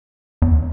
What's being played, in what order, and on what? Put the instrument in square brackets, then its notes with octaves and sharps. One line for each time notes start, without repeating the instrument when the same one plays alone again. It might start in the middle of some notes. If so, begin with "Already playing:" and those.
[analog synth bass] E2